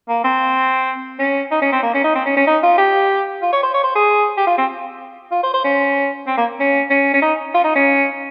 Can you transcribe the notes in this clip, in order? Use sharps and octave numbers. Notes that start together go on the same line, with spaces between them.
A#3
C4
C#4
D#4
C#4
C4
A#3
C#4
D#4
C4
C#4
C#4
D#4
F4
G4
F4
C#5
C5
C#5
C5
G#4
G4
F4
C4
F4
C5
C5
C#4
C4
A#3
C#4
C#4
C#4
D#4
F4
D#4
C#4